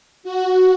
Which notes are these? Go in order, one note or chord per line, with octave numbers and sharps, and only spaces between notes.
F#4